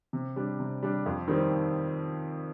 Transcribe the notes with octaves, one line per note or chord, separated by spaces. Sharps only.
C3
G3 D4
C3
G3 D4
F2
D#3 G3 C4